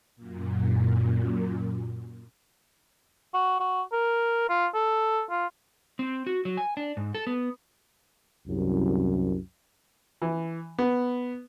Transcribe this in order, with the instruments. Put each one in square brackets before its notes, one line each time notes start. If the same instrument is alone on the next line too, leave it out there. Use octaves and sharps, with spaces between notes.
[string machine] F#2 A#2
[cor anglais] F#4
F#4
A#4
F4
A4
F4
[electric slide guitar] C4
F#4
F#3
G#5
D4
G#2
A4
B3
[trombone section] C2 F#2
[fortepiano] E3
B3